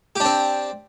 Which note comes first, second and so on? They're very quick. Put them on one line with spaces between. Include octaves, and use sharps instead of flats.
G4 D4 C4